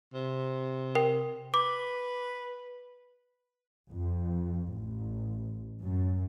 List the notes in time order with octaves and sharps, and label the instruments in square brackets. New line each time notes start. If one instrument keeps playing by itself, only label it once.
[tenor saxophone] C3
[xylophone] A#4 G5
[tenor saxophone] B4 [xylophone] D6
[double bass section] F2
A1
F#2